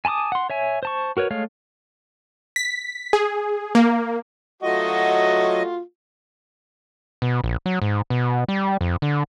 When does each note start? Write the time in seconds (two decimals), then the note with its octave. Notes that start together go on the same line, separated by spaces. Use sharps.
0.05 G#5 A5 B5 D6 D#6
0.32 F#5 C6
0.50 C#5 E5 G#5
0.83 C5 A5 C#6
1.17 F#4 A#4 B4 C#5
1.30 G#3 A3 C#5 F5
2.56 B6
3.13 G#4
3.75 A#3
4.63 F#3 A3 F4 F#4 D#5
7.22 B2
7.44 A#1
7.66 F#3
7.82 G#2
8.10 B2
8.48 G3
8.81 F2
9.02 D3